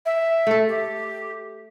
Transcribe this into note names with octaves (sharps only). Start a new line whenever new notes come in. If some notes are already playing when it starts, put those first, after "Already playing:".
E5
A3 A4
G4